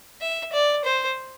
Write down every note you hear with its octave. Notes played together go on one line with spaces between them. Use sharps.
E5
D5
C5